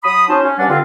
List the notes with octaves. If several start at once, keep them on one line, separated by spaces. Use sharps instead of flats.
F#3 B5 D#6
C#4 D#4 F#4 C5 A5
C#4
G2 G3 C#4 D4 F#5
G2 D3 C4 F4